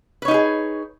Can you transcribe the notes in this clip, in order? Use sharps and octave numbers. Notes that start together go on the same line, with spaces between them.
D#4 G4 G#4 B4 C#5